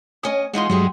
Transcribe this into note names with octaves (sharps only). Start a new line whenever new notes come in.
D2 C#4 D#5 G#5 D#6
E3 G#3 D#4 F4 F#5 C6
G2 F#3 G#3 A3 G4 G#4